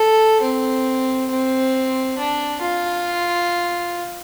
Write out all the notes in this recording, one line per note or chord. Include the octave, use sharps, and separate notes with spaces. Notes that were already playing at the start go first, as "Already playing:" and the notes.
Already playing: A4
C4
C4
D4
F4